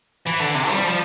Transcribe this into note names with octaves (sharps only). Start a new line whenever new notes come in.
E3
D3
C3
G3
F3